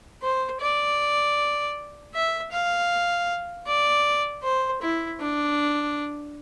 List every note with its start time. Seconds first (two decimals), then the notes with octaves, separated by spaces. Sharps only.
0.22 C5
0.61 D5
2.14 E5
2.52 F5
3.67 D5
4.43 C5
4.82 E4
5.21 D4